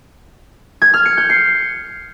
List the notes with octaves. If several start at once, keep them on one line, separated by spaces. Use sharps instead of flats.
G#6
F6
C#7
G6
C7